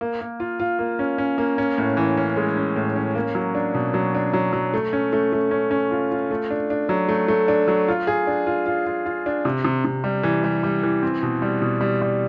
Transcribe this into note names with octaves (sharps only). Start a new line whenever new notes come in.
A#3
A#3
F4
F4
A#3
C#4
C#4
A#3
C#4
A2
E3
C#4
G#3
C#4
A2
C#4
A#3
F#3
D4
B2
F#3
D4
F#3
F#3
A3
C#4
A3
A3
C#4
C#4
F4
F4
A3
D4
D4
F#3
A3
A3
D4
F#3
F4
G#4
D4
F4
F4
F4
F4
D4
C3
C3
C3
G3
E3
G3
G3
E3
C4
B2
G3
B2
G3
G3